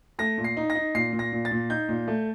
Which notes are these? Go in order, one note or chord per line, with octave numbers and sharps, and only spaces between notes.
A3 A#6
A#2
C7
D#4
A#6
D#4
A#2 C7
A#2
A#6
A#2
A6
A#2
D#4 G6
A#2
A3